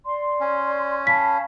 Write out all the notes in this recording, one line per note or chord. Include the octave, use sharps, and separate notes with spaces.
D5 C6
C#4
F5 A5 B5 B6